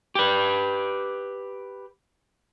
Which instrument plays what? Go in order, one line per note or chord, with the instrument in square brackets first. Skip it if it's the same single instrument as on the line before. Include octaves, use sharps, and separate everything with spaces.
[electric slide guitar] G4 B4